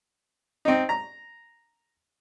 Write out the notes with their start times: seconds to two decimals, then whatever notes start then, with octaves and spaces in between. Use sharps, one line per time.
0.65 C4 D#4
0.89 A#5